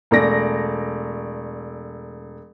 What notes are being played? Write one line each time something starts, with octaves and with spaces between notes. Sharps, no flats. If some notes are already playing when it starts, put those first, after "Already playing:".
E1 A3 D5 A#6